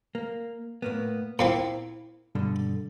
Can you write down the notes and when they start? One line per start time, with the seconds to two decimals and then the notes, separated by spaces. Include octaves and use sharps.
0.15 A#3
0.82 A2 A#3 B3
1.39 A#2 A#3 C4 E4 A#5
2.35 G2 B2 D3